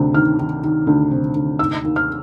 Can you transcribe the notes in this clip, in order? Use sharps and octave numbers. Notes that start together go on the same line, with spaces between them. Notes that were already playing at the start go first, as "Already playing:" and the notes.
Already playing: D2 C3 D#3
D#3 F6
D#3
D#3
D2
C3
D2
D#2 E6
D#2
F6